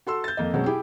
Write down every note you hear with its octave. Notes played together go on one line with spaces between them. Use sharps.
F#4 A4 C6 E6
G6 A6
F2 A#3 D#5
B2 F#3 G#3 C4 C#4
E4 G4 G#4 G5